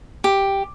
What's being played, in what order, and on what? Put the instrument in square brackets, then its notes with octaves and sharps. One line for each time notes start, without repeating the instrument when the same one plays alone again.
[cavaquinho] G4